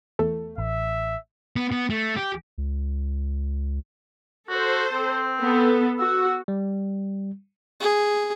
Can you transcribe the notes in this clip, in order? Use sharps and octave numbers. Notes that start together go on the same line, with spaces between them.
E2 A3
A1 E5
B3
B3
A3
G4
C#2
F#4 A4 C5
C4
B3 A4
F#4 E6
G3
G#4